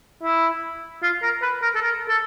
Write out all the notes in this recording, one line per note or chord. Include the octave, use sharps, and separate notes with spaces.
E4
F4
A#4
B4
A#4
A4
A#4
A4